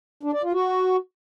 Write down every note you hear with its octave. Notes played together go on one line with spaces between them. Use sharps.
D4
D5
F4
F#4